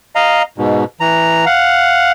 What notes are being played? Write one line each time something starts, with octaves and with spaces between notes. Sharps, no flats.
D#5 F5 A#5
G#2 B2
E3 A#5
F5 F#5